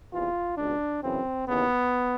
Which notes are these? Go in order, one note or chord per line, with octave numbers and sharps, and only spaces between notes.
E2 C3 E3 F4
C#2 B2 D4
F#2 C#3 E3 C4
D#2 C#3 E3 B3